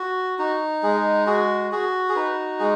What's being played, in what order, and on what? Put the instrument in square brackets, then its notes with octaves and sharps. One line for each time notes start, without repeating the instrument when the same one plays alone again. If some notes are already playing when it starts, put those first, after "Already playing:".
Already playing: [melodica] F#4
D#4 F#4
G#3 G#4
F#4 G#4
F#4 G#4
G#4
D#4 B4
G#3 G#4